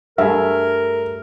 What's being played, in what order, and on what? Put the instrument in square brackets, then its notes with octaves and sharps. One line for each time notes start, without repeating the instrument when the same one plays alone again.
[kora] G2 A3 G#4 [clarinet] A#4 [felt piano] E5